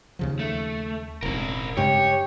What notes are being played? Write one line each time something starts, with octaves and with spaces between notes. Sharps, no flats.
D#2 C#3 F3
A3
E1 A1 C4 A#4
G2 C#3 G#3 G4 C#5